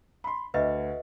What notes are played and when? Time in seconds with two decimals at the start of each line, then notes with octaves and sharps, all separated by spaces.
0.24 B5 C6
0.54 D2 B4 D#5 E5